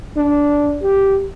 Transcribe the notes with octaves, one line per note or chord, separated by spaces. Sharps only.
D4
G4